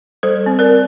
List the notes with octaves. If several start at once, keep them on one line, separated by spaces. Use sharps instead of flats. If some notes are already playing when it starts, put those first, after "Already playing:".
G3 A4 C5
C4
A#4 D5
C4